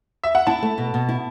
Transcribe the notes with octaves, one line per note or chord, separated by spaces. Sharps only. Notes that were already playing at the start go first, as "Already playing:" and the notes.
E5
F#5
E4 A5
A3
B2
B2
E4